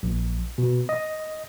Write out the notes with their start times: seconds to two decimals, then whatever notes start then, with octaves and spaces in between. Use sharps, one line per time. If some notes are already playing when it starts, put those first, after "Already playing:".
0.03 A#1
0.58 B2
0.89 D#5